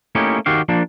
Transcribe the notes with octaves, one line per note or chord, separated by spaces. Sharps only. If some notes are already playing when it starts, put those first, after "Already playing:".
A3 A#3 C#4 D#4 E4 G4
D#3 F#4 G4 F5
F3 A#3 D4